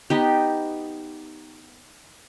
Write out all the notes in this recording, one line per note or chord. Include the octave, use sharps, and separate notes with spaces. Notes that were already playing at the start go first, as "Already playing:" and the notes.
B3 D#4 G4